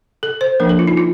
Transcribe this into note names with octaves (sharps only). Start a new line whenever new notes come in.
A4
C5
F3 A#3 D4 A#4
A4
F4
D#4
F4